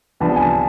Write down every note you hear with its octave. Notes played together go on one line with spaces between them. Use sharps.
C2 C3 F3 B3 D4 A5
G#5
A5